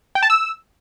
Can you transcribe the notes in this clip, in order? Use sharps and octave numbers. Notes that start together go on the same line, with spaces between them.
G5
A5
E6